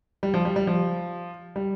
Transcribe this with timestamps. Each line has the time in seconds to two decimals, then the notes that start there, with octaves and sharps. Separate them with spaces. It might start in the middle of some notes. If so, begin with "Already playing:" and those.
0.23 G3
0.34 F3
0.45 G3
0.56 G3
0.67 F3
1.56 G3